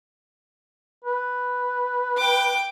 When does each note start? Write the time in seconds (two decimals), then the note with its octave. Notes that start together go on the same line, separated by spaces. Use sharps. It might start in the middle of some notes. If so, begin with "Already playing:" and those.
1.05 B4
2.17 G5 D6